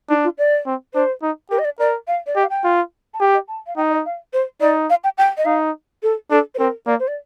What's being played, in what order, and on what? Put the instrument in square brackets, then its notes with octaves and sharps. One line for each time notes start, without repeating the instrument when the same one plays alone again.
[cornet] D4 [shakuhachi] D#4
[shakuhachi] F4
D5
[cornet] C4
[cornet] D4 [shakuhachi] C5
[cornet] D#4
[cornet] G4 [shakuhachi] A#4
[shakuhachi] D#5
D5
[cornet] A#4 [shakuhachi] D5
[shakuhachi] F5
D5
[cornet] G4 [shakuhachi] D#5
[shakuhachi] F5
G5
[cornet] F4
[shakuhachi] A5
[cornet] G4 [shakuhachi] G5
[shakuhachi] D#5
A5
F5
[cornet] D#4 [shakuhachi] G5
[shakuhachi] D#5
F5
C5
[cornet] D#4 [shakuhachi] D5
[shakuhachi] F5
G5
G5
D#5
[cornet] D#4 [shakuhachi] F5
[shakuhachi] A4
[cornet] D4 [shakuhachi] A4
[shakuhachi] C5
[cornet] C4 [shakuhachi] A#4
[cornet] A#3 [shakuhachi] D5
[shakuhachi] C5
D5